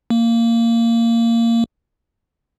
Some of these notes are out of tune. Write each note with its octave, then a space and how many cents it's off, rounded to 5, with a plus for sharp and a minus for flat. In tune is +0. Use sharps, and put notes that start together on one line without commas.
A#3 -15